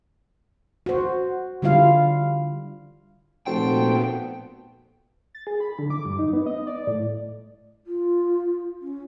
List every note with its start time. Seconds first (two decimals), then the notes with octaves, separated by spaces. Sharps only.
0.86 F#4 C5
1.62 D3 G3 E4 F4 F5
3.47 F1 A#2 B3 F#4 A4 C5 G5
5.35 A6
5.47 G#4
5.60 B5
5.79 D3
5.90 D6
6.06 G2
6.19 D#4
6.33 B3
6.46 D#5
6.67 D5
6.87 A2
7.87 F4
8.82 C#4